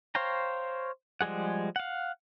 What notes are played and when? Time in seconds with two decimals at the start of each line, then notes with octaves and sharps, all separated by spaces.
0.15 C5 C#5 F5 G5 A#5
1.21 F3 G3 G#3 G#4 F#5
1.76 F5 F#5